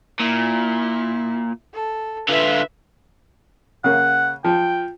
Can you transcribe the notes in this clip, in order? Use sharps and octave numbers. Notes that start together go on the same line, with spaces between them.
A#2 E4
A4
D3 F4 B4 E5
C#3 A#3 F#5
F3 G5